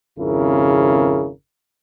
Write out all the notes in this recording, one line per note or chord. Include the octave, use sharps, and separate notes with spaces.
G#1 F2 C#3 E4 A#4